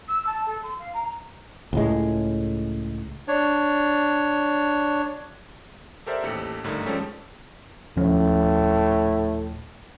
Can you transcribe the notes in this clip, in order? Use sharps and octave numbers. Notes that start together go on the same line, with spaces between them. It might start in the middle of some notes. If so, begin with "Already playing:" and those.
E6
A5
A4
C6
F5
A#5
C#2 A2 G#3
D4 C#5
G4 A4 A#4 C5 D5 E5
A1 D#2 G4 A4 C#7
G#1 G2 D3 A3 D#4 A#4
F3 G3 G#3 C#4 G4 A4
D#1 A2 F3 C#4